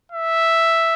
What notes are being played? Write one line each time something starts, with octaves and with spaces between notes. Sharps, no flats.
E5